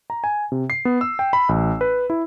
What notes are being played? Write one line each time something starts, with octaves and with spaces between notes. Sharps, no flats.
A#5
G#5
C3
C7
B3
E6
G5
B5
A1
B4
E4